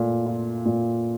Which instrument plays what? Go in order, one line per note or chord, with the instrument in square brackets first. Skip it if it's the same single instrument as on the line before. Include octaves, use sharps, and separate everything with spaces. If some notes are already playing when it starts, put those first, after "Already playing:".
Already playing: [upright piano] A#2 A3
F4
A#2